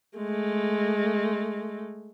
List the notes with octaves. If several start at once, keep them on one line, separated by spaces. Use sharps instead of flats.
G#3 A3